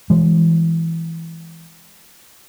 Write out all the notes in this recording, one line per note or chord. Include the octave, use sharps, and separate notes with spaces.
E3 G#3